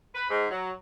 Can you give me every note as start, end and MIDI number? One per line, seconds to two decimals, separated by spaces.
0.15 0.29 71
0.30 0.46 44
0.51 0.70 54